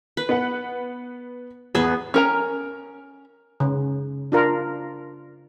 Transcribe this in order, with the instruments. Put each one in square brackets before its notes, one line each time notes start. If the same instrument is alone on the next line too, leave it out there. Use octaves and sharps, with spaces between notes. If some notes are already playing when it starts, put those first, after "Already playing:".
[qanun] B4
[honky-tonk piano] B3 F#5
[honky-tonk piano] E2 D#6 [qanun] B3 G#4
[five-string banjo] C#4 A#4 A#5
[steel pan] C#3
D4 F4 A#4